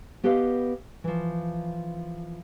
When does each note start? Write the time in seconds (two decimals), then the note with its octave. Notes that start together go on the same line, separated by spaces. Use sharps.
0.24 B3 G4 B4 D#5 F5
1.04 E3 F3